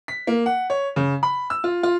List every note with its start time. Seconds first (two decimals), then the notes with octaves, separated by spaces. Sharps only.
0.08 B6
0.27 A#3
0.46 F#5
0.70 C#5
0.96 C#3
1.23 B5
1.50 E6
1.64 F4
1.83 F4